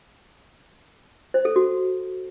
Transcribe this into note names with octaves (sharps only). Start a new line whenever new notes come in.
C5
A4
F#4